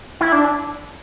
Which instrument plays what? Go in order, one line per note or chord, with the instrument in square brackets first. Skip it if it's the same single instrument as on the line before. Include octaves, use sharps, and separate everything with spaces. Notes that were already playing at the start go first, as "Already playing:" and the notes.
[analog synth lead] E4
D4